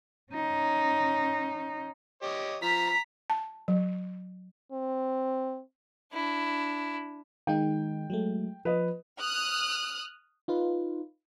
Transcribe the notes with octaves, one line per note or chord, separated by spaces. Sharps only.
C#4 D#4
G4 C#5 D#5
F3 A#5 B6
A5
F#3
C4
D4 E4
D#3 G#3 D#4 G5
F#3 G#3 A3
F3 B4 D#5
D#6 F6 F#6
D#4 F4 B4